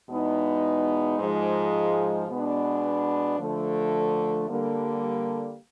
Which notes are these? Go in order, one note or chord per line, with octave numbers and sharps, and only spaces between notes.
E2 B2 G#3 B3 D#4
G#2 F3 G#3
B2 G#3 B3 D4
D3 F3 A3
D3 G3 A#3